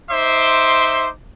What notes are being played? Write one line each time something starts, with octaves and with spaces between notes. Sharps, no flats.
D#4 C5 E5 C6 D6